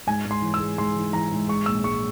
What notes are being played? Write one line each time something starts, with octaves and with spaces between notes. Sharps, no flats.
G#2 G#5
G#2
C6
E3
E6
G#3
G#2 C6
E3
E3 A#5
G#2
G#3 C#6
A#1 E6
G#3 C#6